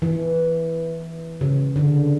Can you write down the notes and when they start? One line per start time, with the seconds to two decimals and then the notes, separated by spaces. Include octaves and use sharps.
0.02 E3
1.41 C#3
1.76 D3